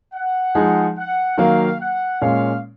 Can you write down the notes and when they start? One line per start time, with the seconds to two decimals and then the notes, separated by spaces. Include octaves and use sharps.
0.13 F#5
0.55 F3 G#3 D#4 G#4
0.97 F#5
1.37 D#3 F#3 A#3 F5
1.80 F#5
2.21 A#2 G#3 C#4 F5